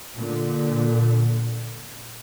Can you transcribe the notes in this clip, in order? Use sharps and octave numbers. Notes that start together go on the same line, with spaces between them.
A#2 D3